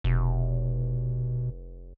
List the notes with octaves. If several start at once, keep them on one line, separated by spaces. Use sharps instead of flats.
F1 B2